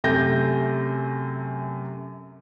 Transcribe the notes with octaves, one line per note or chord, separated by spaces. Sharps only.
F#2 C3 A3 G6 A#6